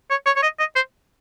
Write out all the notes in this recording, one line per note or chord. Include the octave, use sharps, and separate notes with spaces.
C#5
C#5
C#5
D#5
D#5
C5